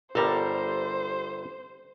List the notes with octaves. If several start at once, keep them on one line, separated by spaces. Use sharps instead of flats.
G1 G3 A4 A#4 C5